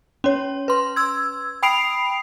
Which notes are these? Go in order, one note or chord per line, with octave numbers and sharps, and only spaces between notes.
C#4 C#5
B4 C6
E6 G#6
G5 B5 D#6 C7 D7 F7